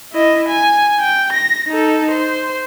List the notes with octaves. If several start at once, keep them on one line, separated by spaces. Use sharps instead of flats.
E4 D#5
G#5
G5
A#6
D#4 A4
C5